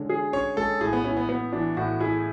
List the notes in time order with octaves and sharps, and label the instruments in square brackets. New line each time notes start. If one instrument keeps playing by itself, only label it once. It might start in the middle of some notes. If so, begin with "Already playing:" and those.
Already playing: [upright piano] D3 G#3 C#4
G#4
[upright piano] C#4 [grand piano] C#5
[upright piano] G#3 [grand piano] A4
[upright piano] A2 [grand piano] G#4
[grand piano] B3
[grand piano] C#4 [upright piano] E4
[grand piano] B3
[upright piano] B3
[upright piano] E3 [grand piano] D4
[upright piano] A2 [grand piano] F#4
[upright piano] E4 [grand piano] G#4